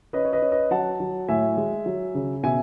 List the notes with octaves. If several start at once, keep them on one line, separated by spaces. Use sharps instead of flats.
C#4 B4 D#5
C#5
B4 D#5
C#4
B4 D#5
F#3 F#5 A5
F#3
A2 E5 G#5
G#3
F#3
C#3
B2 E5 G#5